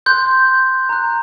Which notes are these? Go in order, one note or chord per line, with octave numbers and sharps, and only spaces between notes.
C6 F#6 G6
A#5 F#6